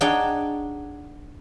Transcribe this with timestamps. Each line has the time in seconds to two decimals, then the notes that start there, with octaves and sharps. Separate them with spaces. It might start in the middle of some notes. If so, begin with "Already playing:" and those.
0.01 D4 D#4 G#4 C#5 F#5 G5